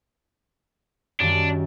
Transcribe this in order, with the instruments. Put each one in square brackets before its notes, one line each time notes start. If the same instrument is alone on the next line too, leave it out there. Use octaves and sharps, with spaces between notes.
[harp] F#2 D#3 G3 [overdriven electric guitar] D4